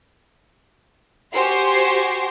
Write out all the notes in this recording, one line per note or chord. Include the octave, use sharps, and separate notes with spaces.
F#4 G4 C5 G#5 C6